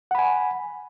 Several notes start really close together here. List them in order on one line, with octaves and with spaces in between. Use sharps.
F#5 B5 G#5